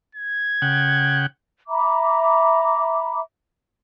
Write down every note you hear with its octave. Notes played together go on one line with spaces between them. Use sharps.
G#6
C#3 F#5 G5
E5 A#5 B5 D6